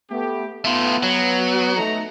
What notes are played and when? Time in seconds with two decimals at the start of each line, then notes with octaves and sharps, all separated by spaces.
0.10 A3 B3 G4
0.64 A3 B3 F4
1.03 F#3
1.75 A3 D#4 A#5